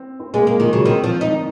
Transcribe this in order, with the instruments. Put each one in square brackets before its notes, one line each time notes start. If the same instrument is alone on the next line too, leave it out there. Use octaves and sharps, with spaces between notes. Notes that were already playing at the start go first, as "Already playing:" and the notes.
Already playing: [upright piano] C4
C4
[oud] G#3 [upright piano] A#3
[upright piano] G#3 [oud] A#3
[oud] D#3 [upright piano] F3
[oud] C#3 [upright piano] F#3
[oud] D#3 [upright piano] C4
[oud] F3
D#4
[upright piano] D#3